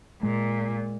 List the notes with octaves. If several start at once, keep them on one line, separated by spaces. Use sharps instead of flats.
A#2 G#3